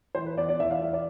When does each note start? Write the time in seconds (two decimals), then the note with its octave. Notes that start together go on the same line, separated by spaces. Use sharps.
0.15 E3 C5
0.26 B4
0.37 E2 D5
0.49 D5
0.60 E3 E5
0.71 F5
0.81 E3 E5
0.93 D5